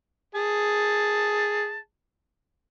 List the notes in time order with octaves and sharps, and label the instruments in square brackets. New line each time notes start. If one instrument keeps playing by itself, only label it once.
[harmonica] G#4 A5